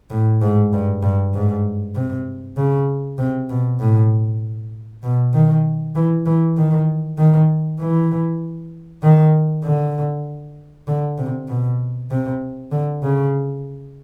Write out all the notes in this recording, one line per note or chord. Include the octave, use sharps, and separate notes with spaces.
A2
G#2
G2
G2
G#2
C3
C#3
C3
B2
A2
B2
D#3
E3
E3
D#3
D#3
E3
D#3
D3
D3
C3
B2
C3
D3
C#3